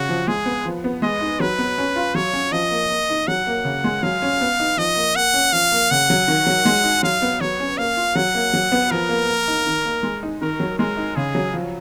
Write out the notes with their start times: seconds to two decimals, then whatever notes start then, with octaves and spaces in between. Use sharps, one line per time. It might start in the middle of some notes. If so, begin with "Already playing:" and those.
Already playing: C#3 F#4
0.09 F3
0.28 G#3 G#4
0.46 B3
0.66 F3
0.84 B3
1.02 G#3 D#5
1.21 D#4
1.40 F#3 B4
1.58 B3
1.78 C#4
1.96 F4
2.15 F#3 C#5
2.33 C#4
2.52 F3 D#5
2.71 A#3
2.90 A#3
3.10 D#4
3.28 F#3 F#5
3.47 A#3
3.65 C#3
3.84 G#3
4.03 F#3 F5
4.22 C#4
4.41 B3
4.60 D#4
4.77 F3 D#5
4.96 A#3
5.16 A#3 F#5
5.34 C#4
5.52 F3 F5
5.72 A#3
5.91 C#3 F#5
6.10 F#3
6.28 D#3
6.46 F#3
6.65 G#3
6.84 D#4
7.03 F#3 F5
7.22 B3
7.41 F#3 C#5
7.60 C#4
7.78 A#3 F5
7.97 F4
8.15 F#3 F#5
8.35 A#3
8.53 F#3
8.72 B3
8.91 F3 A#4
9.09 A#3
9.28 A#3
9.48 D#4
9.67 D#3
9.85 A#3
10.03 G#3
10.23 D#4
10.41 D#3 A#4
10.60 F#3
10.78 G#3 A#4
10.97 D#4
11.16 C#3 G#4
11.35 F#3
11.54 F3